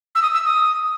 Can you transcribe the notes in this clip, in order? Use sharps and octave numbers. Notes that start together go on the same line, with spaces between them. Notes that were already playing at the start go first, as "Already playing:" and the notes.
E6
D#6
E6
D#6